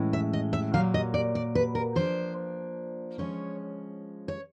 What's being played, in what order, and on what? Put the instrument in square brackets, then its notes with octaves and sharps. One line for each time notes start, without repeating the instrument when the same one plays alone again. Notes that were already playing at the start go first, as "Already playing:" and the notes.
Already playing: [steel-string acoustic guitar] A2 E3 G#3 C#4
E5
D#5
E5
A#2 F#3 A#3 F5
D#5
D5
D5
B4
A#4
F3 A#3 D4 C5
F3 G#3 C#4 C#5
C#5